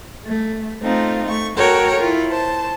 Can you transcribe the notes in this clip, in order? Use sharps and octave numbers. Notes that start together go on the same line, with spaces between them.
A3
A3 C4 D#4 F4
A3 C#6
F#4 A4 A#4 C#5 G5
E4 F4
C5 A5